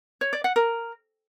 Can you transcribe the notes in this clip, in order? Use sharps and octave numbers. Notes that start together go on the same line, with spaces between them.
C#5
D5
F#5
A#4